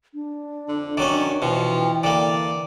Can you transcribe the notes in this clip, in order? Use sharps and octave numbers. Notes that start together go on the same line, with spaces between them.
D4
F2 D3
D#3 F#3 C#4 D5
B2 E3 F3 G5
D3 A#3 D5